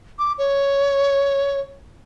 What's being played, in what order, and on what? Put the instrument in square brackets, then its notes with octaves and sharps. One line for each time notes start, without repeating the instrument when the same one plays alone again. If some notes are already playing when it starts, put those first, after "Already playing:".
[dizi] D6
C#5